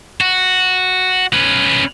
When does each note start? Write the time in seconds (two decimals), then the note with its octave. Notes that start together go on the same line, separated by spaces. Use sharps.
0.21 F#4
1.33 C#4 B4